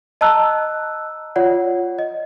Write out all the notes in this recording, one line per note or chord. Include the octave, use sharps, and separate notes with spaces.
D#5 A5 A#5 E6 F#6
F4 C#5 D5 F#5
D#5